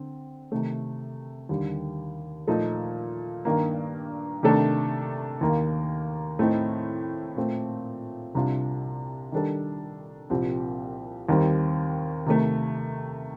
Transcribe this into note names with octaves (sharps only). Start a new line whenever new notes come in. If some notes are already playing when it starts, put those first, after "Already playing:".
Already playing: D3 C4
C3 D#3 A3
D#2 D3 G3
A#2 F3 A3 D#4 A4
G2 D#3 A#3
C3 D#3 A3 D4 A4
D#2 D#3 A#3
A2 A3 C4 D#4
A#2 A3 C4
C2 C3 G3 D4 F4
D#3 G3 D4 A4
C2 A#2 F3 C4 G4
D#2 D#3 G3 C4
C3 D#3 A3